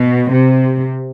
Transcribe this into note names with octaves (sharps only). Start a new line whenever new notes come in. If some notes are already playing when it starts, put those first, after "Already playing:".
Already playing: B2
C3